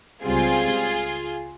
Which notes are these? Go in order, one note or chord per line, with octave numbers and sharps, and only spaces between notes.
C#2 C#3 G3 C4 F4 G#4